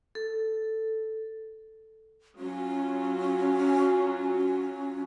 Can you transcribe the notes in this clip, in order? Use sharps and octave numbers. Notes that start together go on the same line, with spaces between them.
A4
F#3 C#4 F4